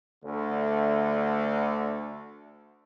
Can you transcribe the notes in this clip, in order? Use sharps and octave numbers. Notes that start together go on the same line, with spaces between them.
D2 D3 A3